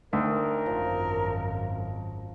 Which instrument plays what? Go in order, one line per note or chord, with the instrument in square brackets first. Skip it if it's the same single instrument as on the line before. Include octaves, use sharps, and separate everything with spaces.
[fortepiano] D2 [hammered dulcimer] D#3 [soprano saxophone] A#4
[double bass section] G#1 F#2 [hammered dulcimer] F3